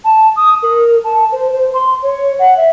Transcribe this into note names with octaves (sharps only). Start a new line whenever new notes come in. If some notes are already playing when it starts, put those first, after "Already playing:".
A5
D#6
A#4
A5
C5
C5
C6
C#5
F#5
E5